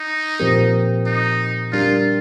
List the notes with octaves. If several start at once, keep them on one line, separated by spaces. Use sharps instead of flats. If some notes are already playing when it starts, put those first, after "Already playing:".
Already playing: D#4
A#2 F3 C4 G4 A#4
D#4
G3 D4 F4 G4 A#4